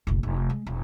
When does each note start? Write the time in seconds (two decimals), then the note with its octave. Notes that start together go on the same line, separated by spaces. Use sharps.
0.07 F1 A#1
0.23 F1
0.50 G#3
0.67 E1